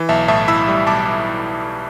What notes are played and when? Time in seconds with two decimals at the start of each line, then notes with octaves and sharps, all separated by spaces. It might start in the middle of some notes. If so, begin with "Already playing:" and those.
Already playing: E3
0.09 B1 E5 A5
0.28 A2 E5 A5
0.48 E4 B5 E6
0.68 G3
0.86 B1 A5 D6